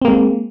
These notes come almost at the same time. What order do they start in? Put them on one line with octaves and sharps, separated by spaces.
C4 A#3 G#3